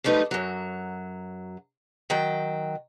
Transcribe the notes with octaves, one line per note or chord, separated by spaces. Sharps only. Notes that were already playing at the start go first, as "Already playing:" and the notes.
F3 G3 A3 D#4 B4
F#2 F#3
D#3 F#3 G5